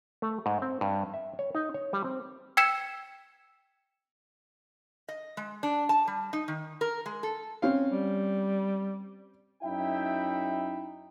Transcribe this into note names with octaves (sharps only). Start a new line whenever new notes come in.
A3
G#2
C4
G2
E5
C#5
D#4
C#5
G3
C4
G5 E6 G#6 B6 C#7 E7
D#5
G#3
D4
A5
G3
D#4
D#3
A#4
G#3
A4
C4 C#4 F5
G3
F#2 D#4 E4 E5 G5